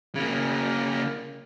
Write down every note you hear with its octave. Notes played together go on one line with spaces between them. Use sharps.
C#3 A#3